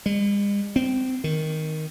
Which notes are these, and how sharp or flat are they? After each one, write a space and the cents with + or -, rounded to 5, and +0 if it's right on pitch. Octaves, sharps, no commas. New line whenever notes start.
G#3 -45
C4 -20
D#3 +5